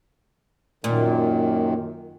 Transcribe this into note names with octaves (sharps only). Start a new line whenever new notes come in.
F#2 A#2 D#3